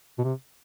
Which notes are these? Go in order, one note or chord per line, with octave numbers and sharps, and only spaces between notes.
B2
C3